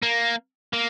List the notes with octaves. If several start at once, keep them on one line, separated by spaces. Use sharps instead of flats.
A#3
A#3